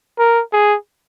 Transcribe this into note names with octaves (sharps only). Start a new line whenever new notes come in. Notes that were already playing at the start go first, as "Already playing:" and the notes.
A#4
G#4